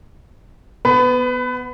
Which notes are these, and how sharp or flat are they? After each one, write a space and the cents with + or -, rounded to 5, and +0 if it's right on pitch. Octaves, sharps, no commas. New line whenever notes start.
B3 +0 B4 +25